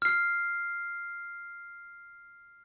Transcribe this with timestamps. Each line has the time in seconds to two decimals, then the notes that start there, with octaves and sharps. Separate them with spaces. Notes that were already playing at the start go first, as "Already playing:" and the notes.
0.02 F6 C7